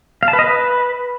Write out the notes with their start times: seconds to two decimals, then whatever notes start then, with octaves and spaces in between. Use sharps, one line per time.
0.23 F5
0.28 A5
0.33 B4
0.39 D#5
0.44 B4